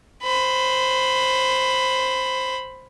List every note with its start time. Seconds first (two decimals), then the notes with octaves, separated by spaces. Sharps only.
0.23 C5 B5